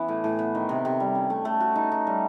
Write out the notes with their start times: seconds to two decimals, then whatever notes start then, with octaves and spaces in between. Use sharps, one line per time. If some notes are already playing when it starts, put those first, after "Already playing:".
Already playing: E3 B3 C#4
0.08 A2
0.24 A2
0.39 B3
0.55 D#3
0.69 C3
0.85 C3
1.00 G3
1.15 C#4
1.30 A3
1.45 A3
1.60 F#4
1.76 D#4
1.92 D#4
2.07 G3